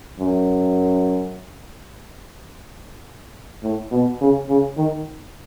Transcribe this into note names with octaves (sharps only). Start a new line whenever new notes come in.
F#2
A2
B2
C#3
C#3
D#3